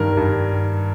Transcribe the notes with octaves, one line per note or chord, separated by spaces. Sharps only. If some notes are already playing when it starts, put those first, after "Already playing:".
Already playing: G2 D#3 A#4
G2